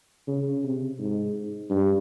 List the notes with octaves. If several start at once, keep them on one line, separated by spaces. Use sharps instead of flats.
C#3
C3
G#2
G2